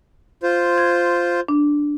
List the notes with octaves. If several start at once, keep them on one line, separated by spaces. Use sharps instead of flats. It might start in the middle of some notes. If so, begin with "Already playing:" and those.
F4 C5
G#6
D4